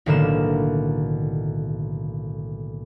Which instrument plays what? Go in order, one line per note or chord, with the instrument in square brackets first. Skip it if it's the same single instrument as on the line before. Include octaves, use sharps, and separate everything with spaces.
[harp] B1 A2 D3 D#3 A#3 E7